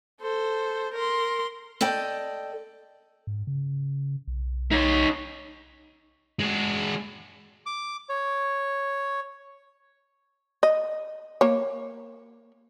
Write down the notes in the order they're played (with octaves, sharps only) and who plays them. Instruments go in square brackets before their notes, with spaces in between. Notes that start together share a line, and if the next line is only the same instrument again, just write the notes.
[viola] A4 C5
A#4 C6
[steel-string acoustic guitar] A4 D5 D#5 G5
[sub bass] G#2
C#3
B1
[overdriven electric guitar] D#4 C#5
[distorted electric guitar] G#3 F#4
[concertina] D6
C#5
[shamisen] D#5
A#3 C#5